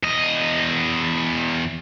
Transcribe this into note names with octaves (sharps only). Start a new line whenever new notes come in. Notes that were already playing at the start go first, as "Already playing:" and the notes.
E2 D#5